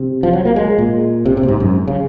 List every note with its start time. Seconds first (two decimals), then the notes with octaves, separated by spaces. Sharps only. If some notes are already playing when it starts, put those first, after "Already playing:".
Already playing: C3
0.23 F3
0.33 F#3
0.45 A#3
0.56 G#3
0.78 A#2
1.26 C3
1.37 C3
1.43 A#2
1.48 G#2
1.60 F#2
1.88 C#3